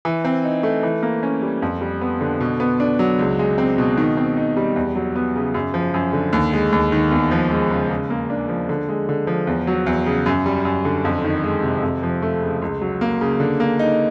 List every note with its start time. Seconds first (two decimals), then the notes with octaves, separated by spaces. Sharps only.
0.05 E3
0.25 C4
0.44 D#4
0.63 A3
0.83 E3
1.03 A#3
1.23 C#4
1.42 G3
1.62 F2
1.81 G3
2.01 B3
2.21 D3
2.40 B2
2.60 B3
2.80 D4
2.99 F#3
3.19 C#2
3.39 G#3
3.58 C4
3.78 B2
3.97 D#3
4.17 C4
4.36 D#4
4.57 G3
4.76 E2
4.95 F#3
5.16 B3
5.36 C#3
5.54 F#2
5.74 F3
5.94 F#2
6.13 D3
6.33 D#2
6.53 G#3
6.72 D#2
6.92 D#3
7.11 E2
7.31 F3
7.51 G#3
7.70 C#3
7.90 C#3
8.10 A#3
8.30 D4
8.49 F3
8.69 D3
8.89 G#3
9.09 D3
9.27 F3
9.47 E2
9.67 F#3
9.86 E2
10.06 C#3
10.26 F#2
10.46 G3
10.65 F#2
10.85 D3
11.05 F2
11.24 D#3
11.43 G#3
11.63 C3
11.83 F2
12.03 F3
12.22 A3
12.42 C#3
12.62 C#2
12.82 F#3
13.01 A#3
13.21 C#3
13.40 D3
13.60 A#3
13.79 D#4